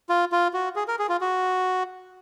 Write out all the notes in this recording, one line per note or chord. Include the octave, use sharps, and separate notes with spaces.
F4
F4
F#4
G#4
A#4
G#4
F4
F#4